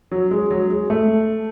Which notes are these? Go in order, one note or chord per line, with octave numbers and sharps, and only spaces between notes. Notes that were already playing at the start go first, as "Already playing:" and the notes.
F#3
G#3
F#3
G#3
A3